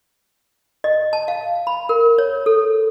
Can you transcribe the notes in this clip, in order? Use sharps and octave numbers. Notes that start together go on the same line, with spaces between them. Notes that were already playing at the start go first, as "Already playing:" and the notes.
D#5
A5
F5
B5
A#4
C#5
A4